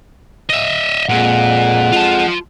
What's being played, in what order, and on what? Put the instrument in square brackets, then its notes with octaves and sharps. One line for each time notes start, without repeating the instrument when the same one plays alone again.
[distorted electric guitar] D#5 E5
[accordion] F2 G#3 F#5 [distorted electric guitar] A#2
[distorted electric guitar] F4 A5